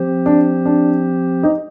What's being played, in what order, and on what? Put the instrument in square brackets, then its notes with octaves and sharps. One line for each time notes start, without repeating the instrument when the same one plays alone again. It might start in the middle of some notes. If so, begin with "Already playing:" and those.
Already playing: [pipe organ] F3 C4 G4 C5
[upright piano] D4
D4
D#4